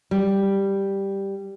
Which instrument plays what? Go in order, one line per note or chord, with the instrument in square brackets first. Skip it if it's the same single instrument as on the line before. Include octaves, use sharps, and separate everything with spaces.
[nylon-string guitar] G3